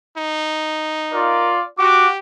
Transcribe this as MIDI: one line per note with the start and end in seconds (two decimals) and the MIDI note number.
0.17 1.65 63
1.13 1.62 65
1.13 1.57 70
1.13 1.62 74
1.79 2.07 66
1.79 2.19 67
1.79 2.10 86